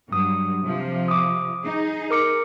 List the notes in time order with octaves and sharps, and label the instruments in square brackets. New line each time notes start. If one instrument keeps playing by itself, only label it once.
[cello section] G2 F#3 [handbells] D#6
[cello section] C3 F3
[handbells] D6 D#6
[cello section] D#4 G#4
[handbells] A#4 D6 C#7